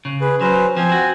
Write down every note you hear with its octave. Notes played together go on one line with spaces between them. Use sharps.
C#3
G#4 B4
F#3 C#4 B4 C5
F3 C4 G#5
F#4